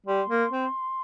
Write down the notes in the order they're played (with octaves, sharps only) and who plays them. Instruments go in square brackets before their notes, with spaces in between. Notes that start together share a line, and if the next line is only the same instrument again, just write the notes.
[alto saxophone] G3 [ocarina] C6
[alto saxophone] A#3
C4